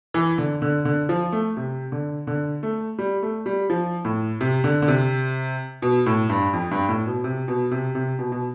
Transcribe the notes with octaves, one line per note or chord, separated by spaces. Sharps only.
E3
D3
D3
D3
F3
A3
C3
D3
D3
A3
G3
A3
G3
F3
A2
C3
D3
D3
C3
B2
A2
G2
F2
G2
A2
B2
C3
B2
C3
C3
B2
B2